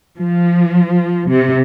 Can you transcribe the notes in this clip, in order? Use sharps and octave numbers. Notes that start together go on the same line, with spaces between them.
F3
C3